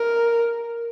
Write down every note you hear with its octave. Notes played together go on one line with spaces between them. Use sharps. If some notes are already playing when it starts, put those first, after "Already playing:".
Already playing: A#4